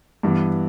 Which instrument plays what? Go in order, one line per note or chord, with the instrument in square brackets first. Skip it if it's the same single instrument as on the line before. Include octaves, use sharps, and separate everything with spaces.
[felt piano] G2 E3 B3